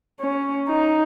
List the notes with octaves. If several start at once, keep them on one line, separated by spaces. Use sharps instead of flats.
C#4
D#4